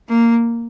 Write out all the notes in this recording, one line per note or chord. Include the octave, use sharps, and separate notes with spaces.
A#3